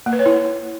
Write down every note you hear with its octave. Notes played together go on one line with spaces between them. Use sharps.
A#3
B4
C#5
E4